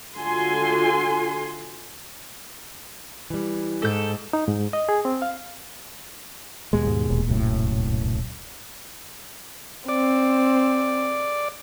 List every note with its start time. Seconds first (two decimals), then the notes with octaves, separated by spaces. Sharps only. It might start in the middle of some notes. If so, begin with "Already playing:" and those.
0.17 D3 F4 F#4 A4 G#5 C6
3.30 E3 G3
3.82 G#2 A4 G6
4.33 D#4
4.48 G#2
4.73 D#5
4.89 G#4
5.05 C4
5.22 F5
6.73 D#2 B2 G#3
6.87 G#2
7.09 D1 A#2
7.28 C2 F#2 A2
9.89 C4 D5